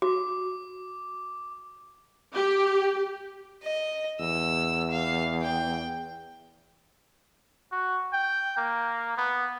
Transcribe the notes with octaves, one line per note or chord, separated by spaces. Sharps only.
F#4 D6
G4
D#5
E2 E6
F5
G5
F#4
G5
A#3
B3